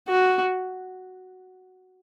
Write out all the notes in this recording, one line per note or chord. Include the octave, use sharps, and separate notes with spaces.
F#4